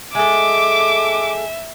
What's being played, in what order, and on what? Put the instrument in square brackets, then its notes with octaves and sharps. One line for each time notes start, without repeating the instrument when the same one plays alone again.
[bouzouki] G#3 A4 [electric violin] E5 [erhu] D6